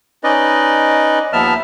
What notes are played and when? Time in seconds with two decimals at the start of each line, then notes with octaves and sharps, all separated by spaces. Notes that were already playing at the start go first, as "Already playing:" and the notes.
0.24 C#4 D#4 B4 D5 D#5
1.33 D#2 F3 B3 E5 A5 F6